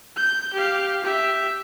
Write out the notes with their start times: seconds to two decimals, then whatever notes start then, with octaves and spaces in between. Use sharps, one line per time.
0.16 G6
0.54 G4 F5
1.04 G4 E5